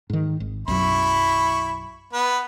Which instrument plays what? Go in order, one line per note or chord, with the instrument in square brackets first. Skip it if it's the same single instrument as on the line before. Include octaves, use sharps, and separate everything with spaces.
[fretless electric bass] G#2 D#3
G#1
[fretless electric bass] B1 F#2 [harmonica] E4 B5 C#6
[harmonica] B3 B4